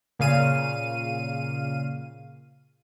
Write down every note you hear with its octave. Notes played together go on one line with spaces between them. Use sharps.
A#2 C#3 F5 D#7